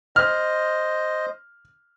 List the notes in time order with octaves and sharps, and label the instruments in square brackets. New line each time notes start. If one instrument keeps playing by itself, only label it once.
[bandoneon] C5 D#5 [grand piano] F6